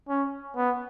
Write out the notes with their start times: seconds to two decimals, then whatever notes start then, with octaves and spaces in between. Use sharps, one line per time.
0.09 C#4
0.56 B3